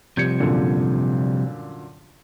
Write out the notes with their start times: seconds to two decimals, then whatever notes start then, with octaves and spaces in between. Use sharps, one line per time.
0.17 C3 F3 G3 G6 G#6 C#7
0.40 F#2 A#2 D3